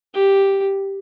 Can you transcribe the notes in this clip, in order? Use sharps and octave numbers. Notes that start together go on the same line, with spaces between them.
G4